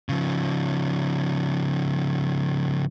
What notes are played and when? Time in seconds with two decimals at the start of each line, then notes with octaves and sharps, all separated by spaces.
0.09 C#3 F3